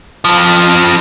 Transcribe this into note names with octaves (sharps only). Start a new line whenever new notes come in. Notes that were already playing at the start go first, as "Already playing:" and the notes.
F2 F3